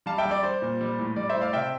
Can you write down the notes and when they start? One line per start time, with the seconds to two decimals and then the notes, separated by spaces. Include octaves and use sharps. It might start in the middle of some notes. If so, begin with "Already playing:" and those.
0.06 G3 F5 A5
0.18 E5 G5
0.25 G3
0.31 D5
0.43 G3 C5
0.62 A#2
0.81 G3
0.99 A2
1.16 G3 D5
1.29 C5 E5
1.36 A2
1.41 D5 F5
1.53 C3 E5 G5